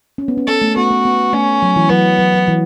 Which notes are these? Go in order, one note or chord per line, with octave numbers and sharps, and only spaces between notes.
C#4
B3
C#4
B3 A4
A3
B3 F#4
B3
B3
A3 C#4
F#3
E3
F#3 B3
F#3
F#3
E3